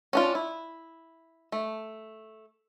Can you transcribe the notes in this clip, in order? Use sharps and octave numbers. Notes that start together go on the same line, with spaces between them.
C#4 D4 F4
E4
A3